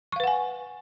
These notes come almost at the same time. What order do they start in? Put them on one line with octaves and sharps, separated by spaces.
C#6 F5 B4 F#5 G#5